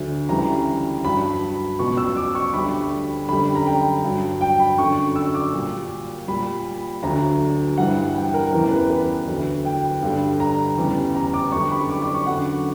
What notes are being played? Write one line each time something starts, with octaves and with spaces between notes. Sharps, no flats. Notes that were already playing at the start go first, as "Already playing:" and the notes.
Already playing: D2 D3 F#3
D2 C#3 E3 G3 A#5
G2 F#3 B5
C#2 B2 F#3 C#6
E6
D6
C#6
D2 D3 G3 B5
F#2 D3 G3 B5
A#5
G5
G2 F#3
G5
B5
F#2 D3 F#3 C#6
E6
D6
A#2 G3
A#2 G3 B5
D2 D3 F#3 A#5
G2 E3 G3 F#5
G5
A#4
E2 C#3 E3 G3 A#4
B4
B4
D2 D3 F#3
G5
G2 D3 G3
A#5
E2 C#3 G3
A#5
D6
F#2 D3 G3 C#6
B5
D6
D6
C#6
F#2 D3 F#3 F#5